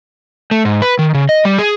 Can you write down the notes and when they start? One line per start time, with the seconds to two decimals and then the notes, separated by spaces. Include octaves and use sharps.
0.51 A3
0.65 G#2
0.82 B4
0.99 D#3
1.14 C#3
1.29 D#5
1.45 G3
1.59 G#4